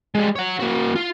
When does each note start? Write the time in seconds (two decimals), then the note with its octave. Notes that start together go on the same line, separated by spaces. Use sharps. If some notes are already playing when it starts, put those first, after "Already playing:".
0.15 G3 G#3
0.35 C#5 F#5
0.59 A#3 F#4
0.95 F4